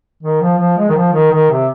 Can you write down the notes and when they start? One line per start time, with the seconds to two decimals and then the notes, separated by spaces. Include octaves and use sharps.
0.23 D#3
0.41 F3
0.58 F3
0.77 G#3
0.89 D#3
0.96 F3
1.12 D#3
1.31 D#3
1.50 C3